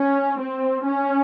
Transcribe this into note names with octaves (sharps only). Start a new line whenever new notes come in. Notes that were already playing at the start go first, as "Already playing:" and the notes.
Already playing: C#4
C4
C#4